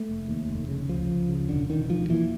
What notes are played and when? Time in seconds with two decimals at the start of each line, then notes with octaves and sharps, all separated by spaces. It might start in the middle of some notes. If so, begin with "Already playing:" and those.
Already playing: A3
0.09 F1
0.28 D#2
0.48 F1
0.69 C#3
0.89 C#2 F3
1.09 C#2
1.29 C#3
1.49 E1 D3
1.70 E1 D#3
1.89 D2 F3
2.09 A#2 E3